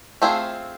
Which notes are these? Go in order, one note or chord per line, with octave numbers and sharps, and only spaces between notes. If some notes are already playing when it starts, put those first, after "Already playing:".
A3 C4 F4 G#4